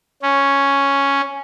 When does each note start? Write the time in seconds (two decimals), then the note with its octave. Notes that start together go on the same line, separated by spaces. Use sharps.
0.22 C#4